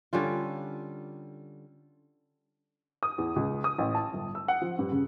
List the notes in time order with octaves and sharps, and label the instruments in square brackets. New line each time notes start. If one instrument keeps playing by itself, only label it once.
[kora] D3 G3 C#4 F4
[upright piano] D#6
E2
C#2
D#6
A1
A5
G1
E6
F#5
F3
G2
C#3